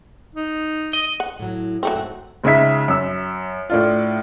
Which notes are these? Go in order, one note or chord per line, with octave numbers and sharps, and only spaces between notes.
D#4
D#5
F#5
A2 F#3
F#3 A3 C4
G#2 F#5
C#2 C#3 D#4 E5 B6
F#2 E6
A2 D4 F4